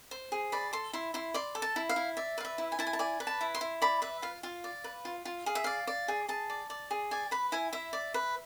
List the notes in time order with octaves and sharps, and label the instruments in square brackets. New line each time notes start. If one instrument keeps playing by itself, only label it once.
[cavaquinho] C5
G#4
D5 B5
A4 C6
E4 C6
E4 C6
D5 C6
A4
A5
E4
F5
E4
D5 E5
B4 F5
E5
E4
G#5
E4 A5
G#5
A5
D5 G#5
B4
A5
E4
C6
E4
D5 B5
B4 E5
F4 F5
F4 F5
D5
B4
F4
F4
G#4 F5
E5
D5 F5
D5
G#4
G#4 A5
D5
D5
G#4
D5 G#5
B4 B5
E4 G#5
E4 E5
D5
B4